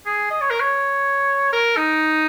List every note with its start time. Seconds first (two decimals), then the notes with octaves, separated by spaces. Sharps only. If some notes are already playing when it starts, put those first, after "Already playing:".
0.06 G#4
0.30 D#5
0.41 C#5
0.50 A#4
0.60 C#5
1.53 A#4
1.77 D#4